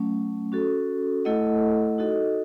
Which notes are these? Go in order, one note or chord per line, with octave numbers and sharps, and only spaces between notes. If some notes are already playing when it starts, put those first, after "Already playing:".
Already playing: F#3 A3 C#4
C#4 F#4 A4
A3 E4 A4 D#5 F#5
D#4 F#4 A4 D#5